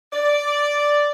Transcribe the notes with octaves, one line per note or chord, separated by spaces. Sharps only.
D5